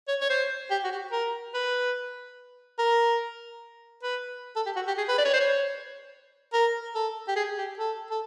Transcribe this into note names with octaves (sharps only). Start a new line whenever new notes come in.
C#5
C#5
C5
G4
F#4
G4
A#4
B4
A#4
B4
A4
G4
F#4
G4
G#4
B4
D5
C#5
C5
C#5
A#4
A4
G4
G#4
G4
A4
A4